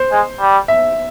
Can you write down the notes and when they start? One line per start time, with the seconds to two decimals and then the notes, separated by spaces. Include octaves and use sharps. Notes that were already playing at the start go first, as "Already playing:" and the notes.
Already playing: C5
0.12 G#3
0.41 G3
0.68 E5